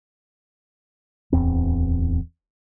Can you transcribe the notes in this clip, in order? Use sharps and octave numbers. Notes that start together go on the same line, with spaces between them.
D1 E2 C4